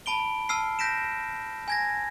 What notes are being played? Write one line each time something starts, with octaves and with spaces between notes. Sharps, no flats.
A5 B5 D7 G7
A5 E6 F6 C7
G6 A#6 B6 D7 E7
G#5 G#6 A#6